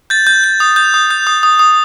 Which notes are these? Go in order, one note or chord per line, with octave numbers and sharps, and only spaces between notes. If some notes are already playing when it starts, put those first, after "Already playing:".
G6 A6
G6
G6
D#6
G6
D#6
G6
D#6
D#6
D#6